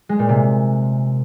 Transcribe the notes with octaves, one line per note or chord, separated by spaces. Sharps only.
G#3
A#2
C3